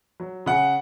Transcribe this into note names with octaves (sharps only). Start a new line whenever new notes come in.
F#3
C#3 F#5